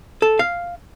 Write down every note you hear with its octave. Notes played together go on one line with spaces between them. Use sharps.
A4
F5